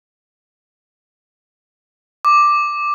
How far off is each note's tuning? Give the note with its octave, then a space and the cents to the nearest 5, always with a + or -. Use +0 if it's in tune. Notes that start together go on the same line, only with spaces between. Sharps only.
D6 +5